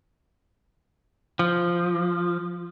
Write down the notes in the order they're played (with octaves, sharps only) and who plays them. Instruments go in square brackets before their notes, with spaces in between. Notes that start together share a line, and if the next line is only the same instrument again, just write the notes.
[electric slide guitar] F3